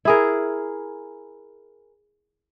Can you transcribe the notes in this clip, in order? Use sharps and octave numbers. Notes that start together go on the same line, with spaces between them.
E4 G#4 A#4